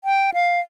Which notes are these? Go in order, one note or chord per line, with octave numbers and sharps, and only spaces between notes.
G5
F5